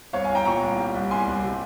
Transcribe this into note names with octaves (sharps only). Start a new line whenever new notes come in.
C2 C#5 F5
F5 G#5
C2
G5 A#5
A#2 A#5 C#6
C2
G3
C2
C2 G#5 C6
C2
C3